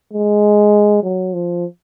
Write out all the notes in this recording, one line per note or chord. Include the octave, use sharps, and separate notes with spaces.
G#3
F#3
F3